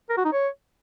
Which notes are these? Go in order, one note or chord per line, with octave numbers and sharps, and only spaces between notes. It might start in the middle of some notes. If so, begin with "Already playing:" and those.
A#4
F#4
D#4
C#5